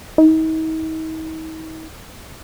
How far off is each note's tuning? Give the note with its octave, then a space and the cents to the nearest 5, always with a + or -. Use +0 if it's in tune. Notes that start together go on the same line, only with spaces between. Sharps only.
D#4 +40